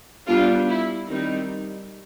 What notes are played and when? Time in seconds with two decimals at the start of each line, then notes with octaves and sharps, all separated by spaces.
0.26 G3 B3 D4 F4
0.67 E4
1.07 D#3 G3 C4 D#4